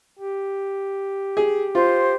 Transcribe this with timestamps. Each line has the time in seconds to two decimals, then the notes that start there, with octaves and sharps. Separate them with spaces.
0.19 G4
1.37 G#4
1.75 F4 C5